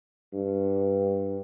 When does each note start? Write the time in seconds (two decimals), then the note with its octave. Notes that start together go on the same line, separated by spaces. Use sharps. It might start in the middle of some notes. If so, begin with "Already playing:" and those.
0.34 G2